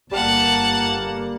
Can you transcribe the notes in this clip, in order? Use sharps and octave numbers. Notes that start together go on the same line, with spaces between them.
G1 G3 A#3 G4 F5 F#5 A5